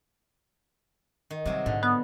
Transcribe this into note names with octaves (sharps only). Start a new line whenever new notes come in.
D#3
C3 F#3 G3 G#4
G#2 D3
B3